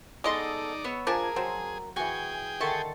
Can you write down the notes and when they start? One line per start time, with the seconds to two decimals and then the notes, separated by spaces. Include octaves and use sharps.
0.24 G#3 B3 D#4 A4 D5 D#5 C6
0.84 B3 C#5 E6
1.07 F3 D4 G#4 A#4 G#5 A5
1.36 F#3 C4 C5 E5
1.96 E3 F#4 G#4 G5 G#5 C#6
2.60 D3 D#3 E5 A5 C6 C#6